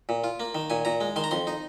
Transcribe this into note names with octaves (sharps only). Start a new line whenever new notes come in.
A#2
F4
A#3
D#3
A#2 G#5
A#2 A#5
G#3
D#3 C6
A#5
F2 C6
D#4